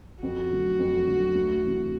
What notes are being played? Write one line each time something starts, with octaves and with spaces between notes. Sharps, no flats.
F2 F#4
D3 F#3 A3
F2
D3 F#3 A3
D2
C3 E3